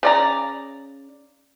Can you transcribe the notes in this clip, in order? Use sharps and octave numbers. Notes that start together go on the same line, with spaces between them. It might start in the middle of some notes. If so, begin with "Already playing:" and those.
C#3 D5 A#5